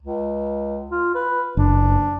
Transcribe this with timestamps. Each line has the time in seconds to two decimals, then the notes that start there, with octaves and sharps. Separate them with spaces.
0.02 C#2
0.91 F4
1.15 B4
1.57 F#1 D4